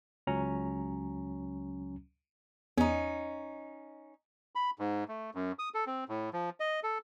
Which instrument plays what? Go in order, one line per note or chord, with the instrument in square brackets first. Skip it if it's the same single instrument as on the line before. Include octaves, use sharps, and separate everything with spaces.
[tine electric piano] C#2 F#3 C#4 A#5
[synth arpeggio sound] E2 [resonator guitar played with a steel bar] C#4 D#4
[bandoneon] B5
G#2
A3
F#2
D#6
A4
C4
A2
F3
D#5
A4